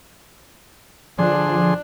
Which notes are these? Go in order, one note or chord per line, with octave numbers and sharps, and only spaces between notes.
D3 F3 D4 G#4 C6